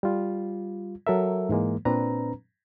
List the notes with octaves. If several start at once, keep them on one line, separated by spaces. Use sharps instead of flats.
G3 F4
F#3 A4 A#4 E5
G#2 E3 G#3 A#3
A#2 C4 D4 B4 A#5